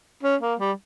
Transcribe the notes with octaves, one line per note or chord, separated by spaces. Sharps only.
C#4
A#3
G3